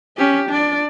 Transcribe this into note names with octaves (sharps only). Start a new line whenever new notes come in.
C#4 G4
D4 D5